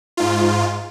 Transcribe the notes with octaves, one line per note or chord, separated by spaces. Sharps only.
G#2 F4